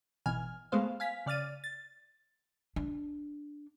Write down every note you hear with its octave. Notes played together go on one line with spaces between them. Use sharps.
G#1 B2 E3 G#5 F6
G#3 A3 B3 C5 F5
F5 G#5 B6
C#3 D5 F6 A6 D#7
A6
D4